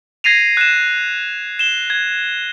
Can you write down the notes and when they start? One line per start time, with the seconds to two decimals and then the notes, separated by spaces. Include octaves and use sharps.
0.24 G#6 A#6 C7 D#7 F7
0.57 F#6 E7
1.59 E7 G7
1.90 G#6